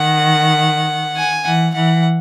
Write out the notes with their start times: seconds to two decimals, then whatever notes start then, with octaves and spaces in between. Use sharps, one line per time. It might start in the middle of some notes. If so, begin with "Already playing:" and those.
Already playing: D#3 F#5
1.16 G#5
1.44 E3 F#5
1.74 E3 F#5